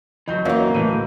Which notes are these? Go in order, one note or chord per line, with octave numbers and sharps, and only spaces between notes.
E3 F#3 D#5 G6
E3 F#3 A#3 C4 C#4 D#4 F#4 F5
A2 E3 D#7